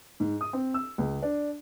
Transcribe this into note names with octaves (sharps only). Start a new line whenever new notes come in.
G#2
D#6
C4
E6
C#2
D4